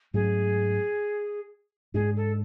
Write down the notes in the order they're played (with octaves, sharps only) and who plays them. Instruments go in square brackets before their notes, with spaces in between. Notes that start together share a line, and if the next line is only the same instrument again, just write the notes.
[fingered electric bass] G#2 F#3 A3 C#4 [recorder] G#4
[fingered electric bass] G#2 G#3 D4 [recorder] G#4
[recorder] A4